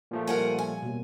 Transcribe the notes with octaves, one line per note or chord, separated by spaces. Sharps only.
A#2 F3 A3
G3 F4 A#4 F#5 G#5
G#5
B2 A#3